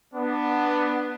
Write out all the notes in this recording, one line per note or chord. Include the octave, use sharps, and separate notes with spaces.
B3 D4